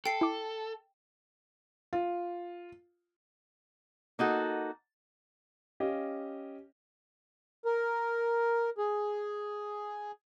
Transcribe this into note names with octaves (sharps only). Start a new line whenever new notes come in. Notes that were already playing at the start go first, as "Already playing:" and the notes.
A4 G5 C7
E4 D6
F4
A#3 D#4 F#4 A4
C#4 G4 D#5 F5
A#4
G#4